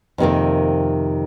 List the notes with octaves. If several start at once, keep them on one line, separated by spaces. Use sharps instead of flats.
F2 C3 D#3 A#3